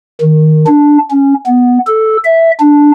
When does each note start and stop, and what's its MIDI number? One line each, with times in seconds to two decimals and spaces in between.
0.21 0.65 51
0.67 0.98 62
1.11 1.34 61
1.46 1.78 59
1.87 2.17 69
2.25 2.51 76
2.60 2.92 62